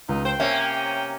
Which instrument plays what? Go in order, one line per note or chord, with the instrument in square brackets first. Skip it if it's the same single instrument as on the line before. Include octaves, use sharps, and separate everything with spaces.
[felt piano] C#2 [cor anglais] D#4
[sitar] C5 [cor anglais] G5
[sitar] C3 A#3 C#4 [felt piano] E5